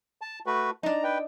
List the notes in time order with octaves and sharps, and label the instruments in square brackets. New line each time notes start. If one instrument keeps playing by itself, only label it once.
[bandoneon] A5
A3 F#4 B4
[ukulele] D4 D#4 [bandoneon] A#5
[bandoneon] B4 G5